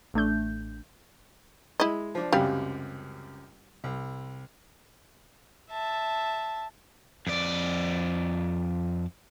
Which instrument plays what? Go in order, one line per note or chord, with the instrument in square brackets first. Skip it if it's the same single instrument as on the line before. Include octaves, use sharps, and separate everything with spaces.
[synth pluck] A1 A3 D4 G6
[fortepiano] G#3 [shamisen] E4 D#5
[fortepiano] F3 D4
[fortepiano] C#2 F#2 C3 [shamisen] G3 F5
[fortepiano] C2
[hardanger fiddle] E5 A5
[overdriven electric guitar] F2 D5